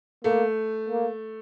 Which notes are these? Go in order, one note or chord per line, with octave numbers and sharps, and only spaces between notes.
A3 A#3
A#3